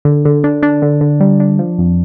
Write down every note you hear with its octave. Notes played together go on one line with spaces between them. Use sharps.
D3
D3
D4
D4
D3
D3
G3
D4
F3
F2